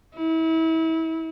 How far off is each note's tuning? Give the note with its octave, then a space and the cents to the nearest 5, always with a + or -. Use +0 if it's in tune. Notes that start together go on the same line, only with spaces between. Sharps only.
E4 -35